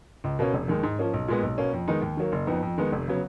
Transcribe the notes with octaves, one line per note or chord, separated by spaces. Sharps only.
C#2
B2 A#3 C#4
F1
D#2 D#3 G#3
G#2
F3 A#3 C#4
B1
A#2 G#3 B3
B1
B2 A#3 C#4
F2
D#3 G#3 B3 D#4
D#2
D#3 F#3 A#3
F#1
F2 F3 B3 D#4
F2
D#3 G#3 B3 D#4
F1
C#3 F#3 B3